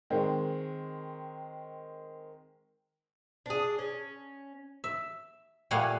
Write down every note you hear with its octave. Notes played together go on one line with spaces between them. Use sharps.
D#3 G#3 C4
D4 G#4
C#4
E5
A#2 G3 A3 F5 F#5 G#5